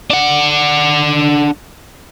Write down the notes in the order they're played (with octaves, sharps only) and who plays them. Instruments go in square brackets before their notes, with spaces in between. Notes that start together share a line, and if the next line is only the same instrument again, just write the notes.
[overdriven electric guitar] D4 F#5